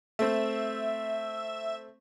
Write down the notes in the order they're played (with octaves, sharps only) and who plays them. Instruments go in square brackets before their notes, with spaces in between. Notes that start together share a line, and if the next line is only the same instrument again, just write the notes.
[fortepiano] A3 C4 [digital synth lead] E5